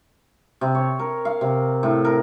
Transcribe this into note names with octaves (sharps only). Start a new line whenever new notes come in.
C3
C#5
A#4
F5
C3
A2
A#4